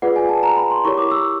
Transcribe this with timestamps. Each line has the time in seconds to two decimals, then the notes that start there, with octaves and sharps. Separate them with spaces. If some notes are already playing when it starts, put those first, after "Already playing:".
0.02 F4 G#4 B4 D5 F#5
0.16 G#5
0.29 A5
0.43 A#5
0.57 B5
0.71 C6
0.84 E4 G4 A#4 C#5 C#6
0.97 D6
1.11 E6